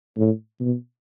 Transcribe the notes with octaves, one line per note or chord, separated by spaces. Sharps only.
A2
B2